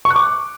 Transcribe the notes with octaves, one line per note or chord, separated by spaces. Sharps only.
C#6
F#6
D6